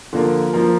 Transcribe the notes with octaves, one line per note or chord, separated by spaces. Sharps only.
D3 F3 A#3 F4 A#4
F3 A#3 F4 A#4